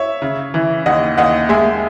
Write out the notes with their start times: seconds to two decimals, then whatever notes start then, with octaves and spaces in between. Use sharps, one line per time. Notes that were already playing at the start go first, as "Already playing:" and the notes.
Already playing: C#5 E5
0.22 C#3
0.54 E3
0.86 D#2 D#5 F#5
1.17 D#2 D#5 F#5
1.49 G#3 E5 G#5